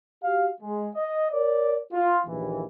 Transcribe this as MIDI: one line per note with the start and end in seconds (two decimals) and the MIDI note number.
0.24 0.48 66
0.24 0.48 67
0.24 0.48 77
0.61 0.89 56
0.95 1.31 75
1.31 1.77 70
1.31 1.77 73
1.31 1.77 74
1.93 2.18 65
2.27 2.65 34
2.27 2.65 39
2.27 2.65 52